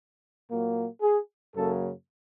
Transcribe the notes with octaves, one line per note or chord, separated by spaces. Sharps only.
A#2 F#3 A#3
G#4
F#2 C#3 F#3 A#3 A4